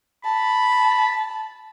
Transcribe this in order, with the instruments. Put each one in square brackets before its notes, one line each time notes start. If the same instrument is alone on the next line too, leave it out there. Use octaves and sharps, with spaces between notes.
[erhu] A5 [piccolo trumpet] B5